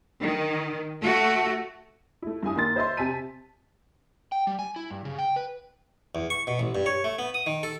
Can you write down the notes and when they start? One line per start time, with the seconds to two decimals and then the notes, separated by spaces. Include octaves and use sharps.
0.22 D#3
1.02 A3 F#4
2.22 A3 E4
2.43 G2 E4 G#5 D#6
2.56 D#3 A#3 C6 A6
2.76 C5 D#5 E5 C6
2.97 C3 G#5 A5 B6 D#7
4.32 G5
4.47 G3
4.59 G#5
4.76 E4
4.90 G2
5.05 C#3
5.18 G5
5.36 B4
6.15 E2
6.30 C#6
6.47 B2
6.59 A1
6.75 G2
6.86 C#5
7.04 A3
7.19 B3
7.34 D#6
7.47 D#3
7.63 A4